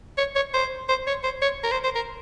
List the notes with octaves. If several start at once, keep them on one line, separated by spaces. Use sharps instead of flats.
C#5
C#5
C5
C5
C#5
C5
C#5
A#4
C5
C5
A#4